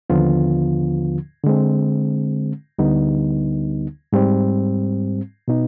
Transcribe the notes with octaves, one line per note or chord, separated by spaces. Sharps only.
D#2 D3 F3 B3 F4
D3 G#3 C4
D2 D3 G3 B3 D#4
G#2 G3 C4
B2 B3 D#4